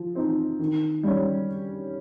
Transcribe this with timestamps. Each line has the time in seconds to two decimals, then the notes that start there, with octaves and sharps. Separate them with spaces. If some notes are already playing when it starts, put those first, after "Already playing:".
Already playing: F3
0.15 C4 D#4
0.59 D#3
1.03 G3 C#4